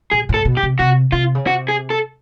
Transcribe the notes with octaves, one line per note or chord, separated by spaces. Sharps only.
A#2 G#4
A2 A4
B2
G4
C3
C3 F#4
C3 F4
C#3
C3 F#4
G#4
A4